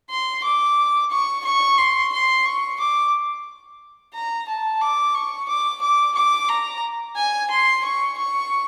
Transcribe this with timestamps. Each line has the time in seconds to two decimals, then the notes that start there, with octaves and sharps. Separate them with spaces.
0.10 C6
0.44 D6
1.11 C#6
1.45 C#6
1.78 C6
2.13 C6
2.45 C#6
2.80 D6
4.14 A#5
4.48 A5
4.81 D6
5.15 C#6
5.49 D6
5.82 D6
6.15 D6
6.49 A#5
7.16 G#5
7.51 C6
7.85 C#6
8.17 C#6